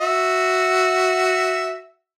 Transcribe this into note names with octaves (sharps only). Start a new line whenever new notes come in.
F#4 E5